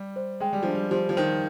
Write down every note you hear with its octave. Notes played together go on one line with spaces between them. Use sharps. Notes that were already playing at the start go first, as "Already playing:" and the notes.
Already playing: G3
C5
G#3 G5
G3
F3 D4
G3
F3 G4
F3
D#3 C5